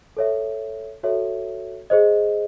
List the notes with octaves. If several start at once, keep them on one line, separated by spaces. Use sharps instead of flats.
A4 C#5 E5
F#4 A4 C#5 E5
G#4 C5 D#5